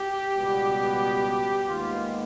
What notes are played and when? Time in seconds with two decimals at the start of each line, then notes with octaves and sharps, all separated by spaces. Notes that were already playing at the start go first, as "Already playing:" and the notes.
Already playing: G4
0.33 C#2 B2 G3 B3
1.68 D#2 D#3 G#3 B3 F4